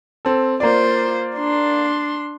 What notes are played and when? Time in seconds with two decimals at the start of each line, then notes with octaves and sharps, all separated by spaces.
0.25 C4 A4
0.60 A#3 F4 C5 D5
1.36 D4 C6